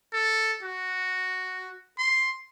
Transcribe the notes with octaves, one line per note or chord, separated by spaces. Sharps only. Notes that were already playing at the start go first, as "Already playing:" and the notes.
A4
F#4
C6